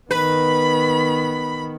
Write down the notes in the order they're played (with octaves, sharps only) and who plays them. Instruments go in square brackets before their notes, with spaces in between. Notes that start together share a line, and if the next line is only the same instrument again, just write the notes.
[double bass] D#3 B3 [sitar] B4 [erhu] B5